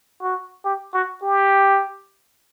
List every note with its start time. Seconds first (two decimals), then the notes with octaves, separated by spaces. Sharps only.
0.22 F#4
0.65 G4
0.93 F#4
1.22 G4